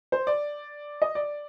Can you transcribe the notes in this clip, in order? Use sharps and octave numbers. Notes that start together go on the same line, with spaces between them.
C5
D5
D#5
D5